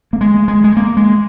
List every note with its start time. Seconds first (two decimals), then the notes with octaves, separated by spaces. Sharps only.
0.13 A#3
0.21 G#3
0.48 G#3
0.64 G#3
0.77 A#3
0.97 G#3